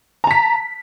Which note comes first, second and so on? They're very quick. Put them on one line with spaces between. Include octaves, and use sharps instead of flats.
A#5 A5 B6